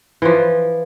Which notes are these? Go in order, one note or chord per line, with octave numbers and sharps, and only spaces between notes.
E3 F3